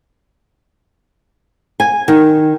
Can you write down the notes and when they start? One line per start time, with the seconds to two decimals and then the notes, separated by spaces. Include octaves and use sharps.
1.80 G#5
2.08 D#3